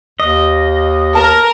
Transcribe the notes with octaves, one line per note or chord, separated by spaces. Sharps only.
D#2 D#5
A#4 A5